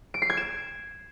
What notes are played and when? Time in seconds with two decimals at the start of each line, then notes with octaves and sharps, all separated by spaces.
0.14 D7
0.22 C7
0.30 G#6
0.37 E7